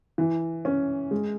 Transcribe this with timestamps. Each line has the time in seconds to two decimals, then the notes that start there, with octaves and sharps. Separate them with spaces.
0.18 E3
0.65 C#4
1.11 G#3